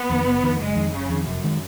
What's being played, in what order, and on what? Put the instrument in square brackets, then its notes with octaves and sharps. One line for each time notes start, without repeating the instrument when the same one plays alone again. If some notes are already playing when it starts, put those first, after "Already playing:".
Already playing: [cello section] B3
[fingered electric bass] F2 D#3
F#1
F2 D#3
[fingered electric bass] F#1 [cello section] G#3
[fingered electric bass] F2 D#3
[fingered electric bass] F#1 [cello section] C#3
[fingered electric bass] F2 D#3
[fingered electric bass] F1 [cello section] F#2
[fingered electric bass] D#3 G#3